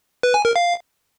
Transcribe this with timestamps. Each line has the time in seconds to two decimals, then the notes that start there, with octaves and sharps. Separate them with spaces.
0.23 B4
0.34 G#5
0.45 A#4
0.56 F5